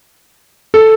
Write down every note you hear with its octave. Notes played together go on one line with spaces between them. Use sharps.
A4